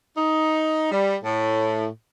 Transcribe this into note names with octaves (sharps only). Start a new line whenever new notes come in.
D#4
G3
A2